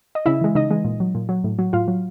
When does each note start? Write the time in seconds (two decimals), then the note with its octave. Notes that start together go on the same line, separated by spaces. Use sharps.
0.15 D#5
0.26 C#3 E4 E5
0.41 E3 G#3
0.55 C#3 D#4 D#5
0.71 E3 G#3
0.85 A#2
1.00 F#3
1.15 A#2
1.29 F#3
1.44 A2
1.59 F#3
1.73 A2 F4 F5
1.88 F#3